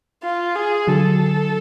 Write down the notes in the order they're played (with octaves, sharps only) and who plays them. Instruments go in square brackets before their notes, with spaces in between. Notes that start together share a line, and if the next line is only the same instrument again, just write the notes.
[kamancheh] F4
G#4
[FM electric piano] D3 F#3 [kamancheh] A4